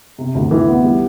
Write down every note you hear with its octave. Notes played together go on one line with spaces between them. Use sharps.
C3
D2
E3
B3
G3